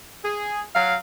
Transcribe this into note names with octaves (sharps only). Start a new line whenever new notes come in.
G#4
F#3 F5